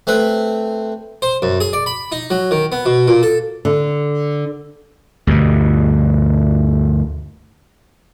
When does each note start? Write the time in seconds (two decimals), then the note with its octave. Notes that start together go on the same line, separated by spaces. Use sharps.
0.07 A3 C4 B4
1.22 C5
1.42 F#2
1.60 G#4
1.73 D5
1.86 B5
2.12 D#4
2.30 F#3
2.51 D#3
2.72 B3
2.86 B2
3.08 A#2
3.23 A4
3.65 D3
5.27 D2 G2 B2